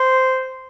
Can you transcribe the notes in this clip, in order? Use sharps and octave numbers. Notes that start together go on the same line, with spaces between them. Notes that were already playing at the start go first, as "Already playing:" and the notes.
Already playing: C5